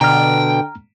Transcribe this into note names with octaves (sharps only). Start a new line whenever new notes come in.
B2 D3 G5 A#5 F6